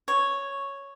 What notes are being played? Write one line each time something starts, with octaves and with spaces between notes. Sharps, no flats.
C#5